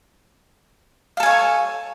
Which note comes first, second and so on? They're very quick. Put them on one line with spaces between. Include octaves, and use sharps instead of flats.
F5 A4 G#5 C#5